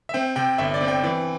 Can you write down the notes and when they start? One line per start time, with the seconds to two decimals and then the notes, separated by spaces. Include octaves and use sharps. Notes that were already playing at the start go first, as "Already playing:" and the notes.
0.09 E5
0.14 C4 G5
0.36 C3 G5
0.58 G1 E5
0.74 D5
0.81 C4
0.88 G5
1.04 E3